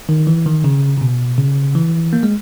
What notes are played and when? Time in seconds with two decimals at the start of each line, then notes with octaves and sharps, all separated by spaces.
0.09 D#3
0.27 E3
0.46 D#3
0.64 C#3
0.98 C#3
1.01 B2
1.38 C#3
1.75 E3
2.13 A#3
2.23 G#3